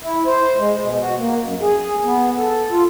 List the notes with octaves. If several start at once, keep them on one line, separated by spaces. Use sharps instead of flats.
E4
C5
G#3
B2
F#4
A#3
F#2
G#4
B3
A4
F4